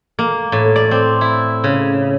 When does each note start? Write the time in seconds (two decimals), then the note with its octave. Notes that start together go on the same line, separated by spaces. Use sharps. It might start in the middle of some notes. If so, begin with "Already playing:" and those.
0.19 A#3
0.52 A2
0.76 D5
0.91 C4
1.21 E4
1.64 C#3